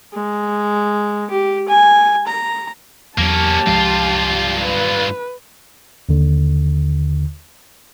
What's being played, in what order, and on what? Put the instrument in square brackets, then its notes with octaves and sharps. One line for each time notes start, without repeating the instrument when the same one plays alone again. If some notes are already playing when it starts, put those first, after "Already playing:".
[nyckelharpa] G#3
G4
G#5
A#5
[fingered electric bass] E2 F#3 [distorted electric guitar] A#3 C#4 [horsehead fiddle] G4 A5
[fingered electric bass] C2 F3 G#3 [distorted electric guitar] G2 F4
[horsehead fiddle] B4
[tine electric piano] D#2 D3